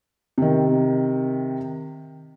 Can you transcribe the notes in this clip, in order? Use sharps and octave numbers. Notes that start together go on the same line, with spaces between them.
C3 D#3